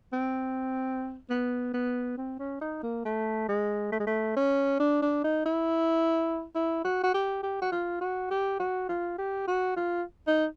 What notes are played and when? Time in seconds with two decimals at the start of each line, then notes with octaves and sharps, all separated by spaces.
0.13 C4
1.29 B3
1.74 B3
2.17 C4
2.39 C#4
2.61 D#4
2.83 A#3
3.05 A3
3.48 G#3
3.92 A3
4.00 G#3
4.07 A3
4.36 C#4
4.79 D4
5.02 D4
5.24 D#4
5.45 E4
6.55 E4
6.84 F#4
7.03 F#4
7.14 G4
7.43 G4
7.61 F#4
7.72 F4
8.01 F#4
8.30 G4
8.59 F#4
8.89 F4
9.18 G4
9.47 F#4
9.76 F4
10.27 D#4